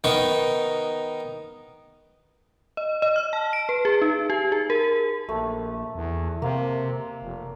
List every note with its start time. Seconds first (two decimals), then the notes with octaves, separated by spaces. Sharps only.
0.04 D#3 B3 D#4 C#6
2.77 D#5
3.02 D#5
3.16 F6
3.33 A5
3.53 D7
3.69 B4
3.85 G#4
4.02 D#4
4.30 G4
4.52 G#4
4.70 A#4
5.29 A#1 A3
5.95 E2
6.42 C3 A#3
7.22 F1